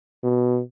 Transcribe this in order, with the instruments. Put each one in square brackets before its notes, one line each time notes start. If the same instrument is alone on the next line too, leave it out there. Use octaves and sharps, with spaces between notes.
[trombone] B2